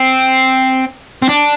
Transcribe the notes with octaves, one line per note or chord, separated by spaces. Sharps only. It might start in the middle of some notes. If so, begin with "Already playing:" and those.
Already playing: C4
C4
D4